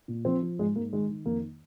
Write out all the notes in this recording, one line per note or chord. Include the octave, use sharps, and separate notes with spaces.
A#2
F3 C4
F3
G#2 G#3
G#2 A#3
D#3 G#3
D#3
F2 A#3